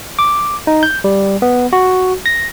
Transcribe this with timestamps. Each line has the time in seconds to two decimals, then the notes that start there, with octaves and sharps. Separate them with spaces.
0.19 D6
0.67 D#4
0.83 G6
1.04 G3
1.42 B3
1.73 F#4
2.26 A#6